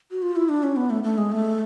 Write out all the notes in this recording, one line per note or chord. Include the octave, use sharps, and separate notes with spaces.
F#4
F4
E4
D4
C#4
B3
A3
A3
G#3
A3